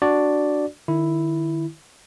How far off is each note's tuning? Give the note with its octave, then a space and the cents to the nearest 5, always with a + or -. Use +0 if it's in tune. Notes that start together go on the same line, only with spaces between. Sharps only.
D4 +0 F#4 +0 D5 +0
D#3 -30 E4 +0